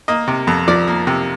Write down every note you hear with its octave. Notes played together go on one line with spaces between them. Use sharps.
A#3 D#5
C3
F2
F3 D5
A#3
C3